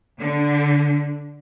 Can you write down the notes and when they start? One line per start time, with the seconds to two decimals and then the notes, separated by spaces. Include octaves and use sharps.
0.20 D3